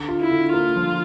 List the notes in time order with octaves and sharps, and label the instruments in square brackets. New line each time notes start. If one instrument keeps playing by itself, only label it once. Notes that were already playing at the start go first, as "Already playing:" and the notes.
Already playing: [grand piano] D3
F4
[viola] E4
[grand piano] D3
[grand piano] A#3 [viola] F4
[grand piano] F3